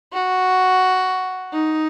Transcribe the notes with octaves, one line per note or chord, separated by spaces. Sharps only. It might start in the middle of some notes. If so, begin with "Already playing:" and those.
F#4
D#4